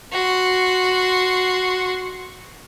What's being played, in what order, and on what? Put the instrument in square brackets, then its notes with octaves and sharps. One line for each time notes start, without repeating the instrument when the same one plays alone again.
[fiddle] F#4 C6